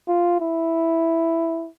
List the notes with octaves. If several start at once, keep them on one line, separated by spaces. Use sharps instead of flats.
F4
E4